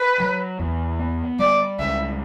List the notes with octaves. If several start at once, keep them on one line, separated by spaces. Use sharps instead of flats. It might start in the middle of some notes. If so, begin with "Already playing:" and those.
Already playing: B4
F#3
E2
B3
G3 D5
C#2 E5